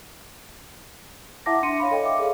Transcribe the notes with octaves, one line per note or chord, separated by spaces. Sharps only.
E4 E5 F#5 A5 D6 A#6
D4 C6 C#7 D#7
C#5 F5 B5
A4 C#5 D#5 G5
E5 D6
G#4 A4 C#5 F5